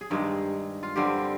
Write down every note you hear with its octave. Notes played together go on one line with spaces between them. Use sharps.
G#4
G2 D#3 G#3 G4
F4
G2 D3 G3 C4 G4